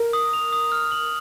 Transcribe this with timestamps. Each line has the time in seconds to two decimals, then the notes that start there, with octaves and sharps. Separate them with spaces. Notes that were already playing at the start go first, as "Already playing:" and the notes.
Already playing: A#4
0.13 D#6
0.33 F7
0.53 D#6
0.72 F6
0.92 F#7